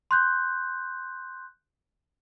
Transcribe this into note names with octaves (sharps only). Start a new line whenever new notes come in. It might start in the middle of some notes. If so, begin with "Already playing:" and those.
C6 F#6 G6